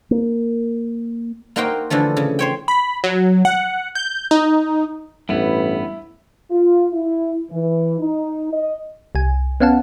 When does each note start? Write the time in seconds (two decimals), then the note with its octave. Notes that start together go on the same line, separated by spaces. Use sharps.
0.11 A#3
1.56 A#3 D#4 F#4 A#4 C5 G5
1.90 D3 E3 F3 A3
2.17 C#3
2.39 C5 C#5 G5
2.68 B5
3.04 F#3
3.45 F#5
3.95 G6
4.31 D#4
5.29 A1 G2 B3 E4
6.51 F4
6.93 E4
7.50 E3
8.00 D#4
8.52 D#5
9.15 C2 G#5
9.60 B3 C#4 F5 F#5 A5